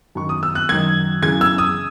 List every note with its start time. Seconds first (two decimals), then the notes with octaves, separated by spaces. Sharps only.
0.15 F#2 D#3 F#3 C#6
0.29 D#6
0.43 E6
0.55 F#6
0.69 F#2 D#3 F#3 G#6
1.22 F#2 C#3 E3 G#6
1.41 E6
1.58 D#6